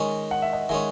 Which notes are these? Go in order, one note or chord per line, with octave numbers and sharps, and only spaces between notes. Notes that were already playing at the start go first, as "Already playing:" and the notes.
Already playing: D#3 G#3 C#4
F#5
E5
D#5 F#5
D#3 G#3 C#4 E5 G#5